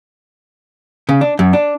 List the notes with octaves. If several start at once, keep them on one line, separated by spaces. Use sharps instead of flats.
C#3
D4
F#2
D4